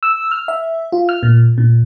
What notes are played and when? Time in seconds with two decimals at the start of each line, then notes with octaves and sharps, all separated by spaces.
0.03 E6
0.31 F6
0.48 E5
0.92 F4
1.09 F6
1.23 A#2
1.58 A#2